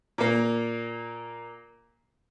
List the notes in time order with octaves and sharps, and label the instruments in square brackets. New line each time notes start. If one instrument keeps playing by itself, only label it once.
[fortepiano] A#2 A#3